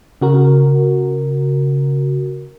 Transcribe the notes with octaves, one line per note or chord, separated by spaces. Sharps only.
C#3 F#4 A#4